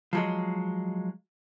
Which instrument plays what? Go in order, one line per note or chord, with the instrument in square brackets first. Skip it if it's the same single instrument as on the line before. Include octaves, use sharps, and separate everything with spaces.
[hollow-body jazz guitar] F3 F#3 G#3